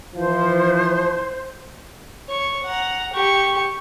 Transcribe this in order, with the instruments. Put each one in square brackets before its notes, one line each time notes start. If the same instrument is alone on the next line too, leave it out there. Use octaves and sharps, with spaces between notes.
[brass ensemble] E3 F3 [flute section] C5
[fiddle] C#5 C#6
F#5 A#5
G4 C#6